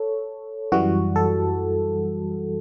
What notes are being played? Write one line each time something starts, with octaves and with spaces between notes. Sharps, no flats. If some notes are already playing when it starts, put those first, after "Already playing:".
Already playing: A4 C#5
F#2 E3 G3 F#4
A4